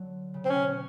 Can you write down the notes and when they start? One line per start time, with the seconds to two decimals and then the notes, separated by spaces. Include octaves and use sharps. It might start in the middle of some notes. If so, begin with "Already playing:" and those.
Already playing: D3 F#3
0.34 C#3
0.45 C3 C4
0.50 C#4
0.56 B2
0.67 B2